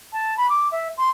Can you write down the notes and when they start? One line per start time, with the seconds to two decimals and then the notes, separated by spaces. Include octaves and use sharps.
0.13 A5
0.37 B5
0.49 D6
0.72 E5
0.98 C6